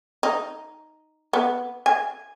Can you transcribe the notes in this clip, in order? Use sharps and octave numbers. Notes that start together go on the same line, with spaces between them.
D#4
B3
G#5